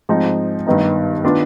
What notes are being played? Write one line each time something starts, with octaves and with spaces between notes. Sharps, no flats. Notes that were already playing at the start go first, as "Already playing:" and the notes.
G#2 F3 C4 D#4
G2 D#3 B3 D#4
D#3 B3 D4 F4